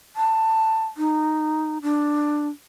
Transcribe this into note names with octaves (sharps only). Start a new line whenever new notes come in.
A5
D#4
D4